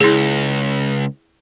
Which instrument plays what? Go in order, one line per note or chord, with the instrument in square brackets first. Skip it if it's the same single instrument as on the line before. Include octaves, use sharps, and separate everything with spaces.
[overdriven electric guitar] C#2 [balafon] E4 G#4